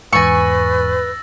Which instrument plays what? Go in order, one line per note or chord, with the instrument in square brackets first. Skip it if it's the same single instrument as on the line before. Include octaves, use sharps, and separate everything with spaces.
[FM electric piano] E2 G#2 [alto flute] B4 [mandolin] G#5 C#6 [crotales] E6 A6 A#6